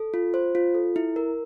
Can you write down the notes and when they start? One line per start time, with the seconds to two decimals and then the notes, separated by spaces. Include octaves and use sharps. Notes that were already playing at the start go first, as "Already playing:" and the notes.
Already playing: A4
0.14 F4
0.34 C5
0.55 F4
0.75 A4
0.96 E4
1.16 A#4